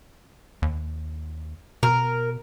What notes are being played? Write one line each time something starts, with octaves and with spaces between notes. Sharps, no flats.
D#2
B2 A#4